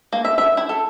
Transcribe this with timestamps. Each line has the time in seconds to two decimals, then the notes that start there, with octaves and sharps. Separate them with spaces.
0.13 A#3
0.25 E5
0.38 E5
0.57 E4
0.69 A4